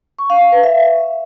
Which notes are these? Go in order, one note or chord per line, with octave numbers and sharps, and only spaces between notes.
C#6
F5
F5
B4
E5